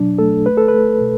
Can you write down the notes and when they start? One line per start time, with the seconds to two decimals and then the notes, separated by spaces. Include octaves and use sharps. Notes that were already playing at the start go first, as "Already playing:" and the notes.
Already playing: B2 F#3 D4
0.18 A3 A4
0.46 A3 B4
0.57 A4
0.68 B4
0.74 A3
1.01 B2